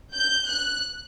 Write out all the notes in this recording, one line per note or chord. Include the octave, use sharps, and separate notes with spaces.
G6
F#6